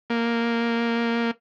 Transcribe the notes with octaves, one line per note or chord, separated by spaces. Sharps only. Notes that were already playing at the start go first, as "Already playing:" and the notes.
A#3